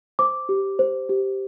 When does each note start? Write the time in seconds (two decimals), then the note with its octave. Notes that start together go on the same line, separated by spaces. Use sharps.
0.19 C5 D6
0.49 G4
0.79 C5
1.09 G4